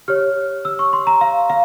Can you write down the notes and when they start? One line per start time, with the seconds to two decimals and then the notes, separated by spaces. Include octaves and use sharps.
0.08 G4 C#5 F6
0.65 E6
0.79 C#6
0.93 C6
1.07 A#5
1.21 F5
1.50 F5